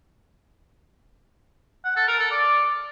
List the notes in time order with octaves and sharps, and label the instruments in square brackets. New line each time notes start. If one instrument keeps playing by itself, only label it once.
[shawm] F#5
A4
A#4
A4
D5